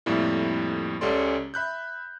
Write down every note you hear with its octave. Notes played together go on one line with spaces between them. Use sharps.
F2 A2 G3 A#3 E4
C#2 C#4 G4 A4 D5 C6
E5 B5 F#6 G6